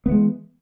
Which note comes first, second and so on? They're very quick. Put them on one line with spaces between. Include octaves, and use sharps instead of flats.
B3 E3 G#3